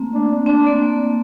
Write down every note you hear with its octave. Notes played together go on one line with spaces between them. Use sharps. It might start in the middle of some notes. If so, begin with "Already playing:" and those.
Already playing: A3 A#3 C4
D4
C4 D4
A#3